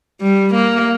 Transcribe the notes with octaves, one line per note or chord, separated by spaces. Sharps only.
G3
A#3